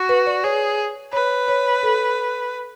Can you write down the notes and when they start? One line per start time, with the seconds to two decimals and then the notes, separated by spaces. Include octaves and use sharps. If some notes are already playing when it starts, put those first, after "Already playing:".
Already playing: F#4
0.09 B4
0.27 D5
0.44 G#4 C#5
1.13 B4 C#5
1.48 C#5
1.83 A4